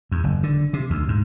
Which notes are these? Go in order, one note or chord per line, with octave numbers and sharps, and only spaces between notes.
E2
F#1
D3
C3
D2
G#2